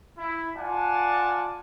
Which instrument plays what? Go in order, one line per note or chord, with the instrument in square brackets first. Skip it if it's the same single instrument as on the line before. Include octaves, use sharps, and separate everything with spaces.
[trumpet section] E4
F4 D5 F#5 G#5 A5